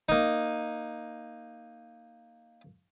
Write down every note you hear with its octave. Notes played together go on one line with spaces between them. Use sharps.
A#3 D#4